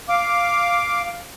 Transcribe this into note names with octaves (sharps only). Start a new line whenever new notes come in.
F5 D6